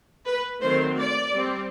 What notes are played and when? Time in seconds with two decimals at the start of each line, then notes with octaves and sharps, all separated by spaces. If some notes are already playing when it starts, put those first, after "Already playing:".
0.26 B4
0.61 D#3 F#3 A3 C4 C5
0.98 D5
1.34 G3 C4